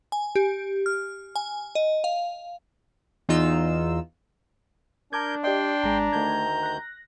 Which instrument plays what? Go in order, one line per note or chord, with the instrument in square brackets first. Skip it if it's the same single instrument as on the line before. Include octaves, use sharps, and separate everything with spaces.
[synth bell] G#5
G4
F6
G#5
D#5
F5
[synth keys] E2 D#4 F4 E6
[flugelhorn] D4 [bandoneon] A#4 G6 [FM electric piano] A5 D6 G#6
[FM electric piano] G4 D5 D#5 [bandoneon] G5 C6
[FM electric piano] G#1 G#3 G#5 [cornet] A#5
[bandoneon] D2 D#3 G6 [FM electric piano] A3 A5 G#6
[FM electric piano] F#6 A#6